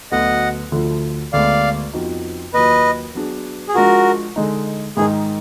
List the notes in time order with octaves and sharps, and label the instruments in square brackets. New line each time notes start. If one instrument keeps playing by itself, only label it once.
[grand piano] D2 D3 F#3 B3 [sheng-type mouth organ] D#5 F#5
[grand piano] D2 D3 F3
[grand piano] D2 D3 G#3 B3 [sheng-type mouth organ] D5 F5
[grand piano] F2 F3 B3 D#4 F#4
[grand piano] D#2 D#3 F#3 A#3 F4 [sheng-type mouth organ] B4 D#5
[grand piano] F#3 B3 D4 G#4
[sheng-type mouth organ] G#4
[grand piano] F3 G#3 D4 F4 [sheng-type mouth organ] F#4 A#4
[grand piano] D3 G#3 D#4
[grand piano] G#2 D#3 G#3 D#4 A#4 [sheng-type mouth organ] G#4